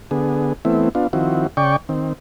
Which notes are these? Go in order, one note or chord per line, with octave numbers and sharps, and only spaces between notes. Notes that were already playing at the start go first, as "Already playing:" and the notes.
D3 B3 G#4
E3 A3 B3 C4 E4
B3 D4 F4
D#3 F3 C4 E4 F#4
C#3 D5 G5 C#6
D#3 C4